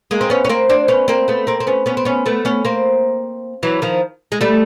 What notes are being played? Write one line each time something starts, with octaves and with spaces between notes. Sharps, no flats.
G#3 A#3
C4
B3 C#4
C#4
A#3 C4
C4 D4
B3 C#4
A#3 C4
A3 B3
A#3 C4
C4
B3 C#4
B3 C#4
C4
B3 C#4
A3 B3
B3 C#4
A#3 C4
E3 F#3
D#3 F3
G#3
G3 A3